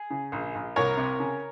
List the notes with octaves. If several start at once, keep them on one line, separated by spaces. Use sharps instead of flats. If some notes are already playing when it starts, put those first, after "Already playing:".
Already playing: G#4
C#3
A#1
A#1
C2 A#4 C#5
C3
C#3